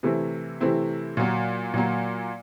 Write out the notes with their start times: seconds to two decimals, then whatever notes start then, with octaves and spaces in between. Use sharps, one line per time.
0.03 C3 E3 A3 C4 E4
0.61 C3 E3 A3 C4 E4
1.17 A#2 F#3 A#3
1.74 A#2 F#3 A#3